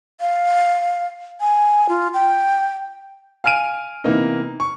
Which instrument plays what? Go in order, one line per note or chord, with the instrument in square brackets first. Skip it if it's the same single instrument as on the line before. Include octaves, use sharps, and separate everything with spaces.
[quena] F5
G#5
F4
G5
[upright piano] F5 G#5 F6 D7 D#7
C3 E3 A#3 B3 D#4
C#6